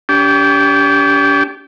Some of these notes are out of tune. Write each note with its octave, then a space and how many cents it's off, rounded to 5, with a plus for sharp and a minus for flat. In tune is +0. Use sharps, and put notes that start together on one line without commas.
D4 -40 G4 +0